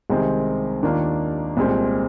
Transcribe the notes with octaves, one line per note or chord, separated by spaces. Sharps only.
C2 C3 D#3 G#3 C4
D#2 D#3 A#3 D4 F4
C2 A#2 G#3 C4